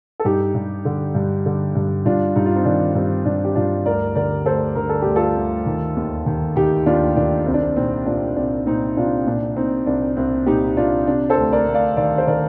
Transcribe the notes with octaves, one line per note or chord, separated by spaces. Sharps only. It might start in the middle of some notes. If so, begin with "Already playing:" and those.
A4
G2 D#4 G4
G2
D3
G2
D3
G2
G2 D4 F4
G2 D#4
F4
C4 D#4
D#3 D4
G2 C4
G2 D4
G4
G2 D4 F4
D2 A#4 D5
D3 A#4 D5
D2 A4 C5
D3 A#4
A4
D2 G4
F4 A4
D2
D#3
D#2
D#3
D#3 D#4 G4
D#2 D4 F4
D#3 D4
C2 C4
D4
C4
A#2 C4 D#4
A#2 D4 F4
C2 D4
A#2 C4 D#4
C2 D4 F4
A#2 D4
A#2 C4 D#4
C2 D4
C2 C4
A#2 D#4 G4
C2 D4 F4
C3 D4
A4 C5
D2
A#4 D5
D2
D5 F5
D#3 D5 F5
C5
D#3 A#4 D5